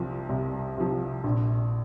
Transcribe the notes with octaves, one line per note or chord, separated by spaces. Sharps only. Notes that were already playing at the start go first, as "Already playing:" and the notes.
Already playing: C2 C3 F3
C2
C3 F3
A#1